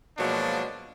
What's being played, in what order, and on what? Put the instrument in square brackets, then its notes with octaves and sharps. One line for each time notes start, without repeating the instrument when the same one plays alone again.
[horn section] B2 F3 F#3 G#3 A#3 D4